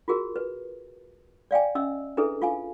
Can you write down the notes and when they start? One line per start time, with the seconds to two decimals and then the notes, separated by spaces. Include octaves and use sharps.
0.08 F4 F#4 G#4 A#4
0.36 B4
1.51 D5 F5 G5 G#5
1.75 C#4 D#5 E5 E6
2.17 D4 E4 G#4 A4 B4 E5
2.42 F4 F5 G#5